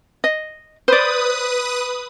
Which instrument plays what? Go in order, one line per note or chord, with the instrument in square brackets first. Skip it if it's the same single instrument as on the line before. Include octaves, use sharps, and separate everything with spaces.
[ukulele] D#5
[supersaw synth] B4 D#6 [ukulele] C5 D5